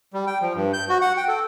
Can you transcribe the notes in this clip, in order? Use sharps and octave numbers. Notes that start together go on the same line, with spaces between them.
G3
G5
F3
G2
G6
F#4
F#5
G5
A4